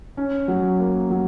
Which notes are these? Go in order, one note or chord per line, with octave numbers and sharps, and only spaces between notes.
C#4
F#3
A#3
F#3